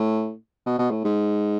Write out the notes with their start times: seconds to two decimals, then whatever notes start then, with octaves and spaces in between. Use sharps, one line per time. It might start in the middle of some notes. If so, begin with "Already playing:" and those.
Already playing: A2
0.66 B2
0.79 B2
0.91 A2
1.04 G#2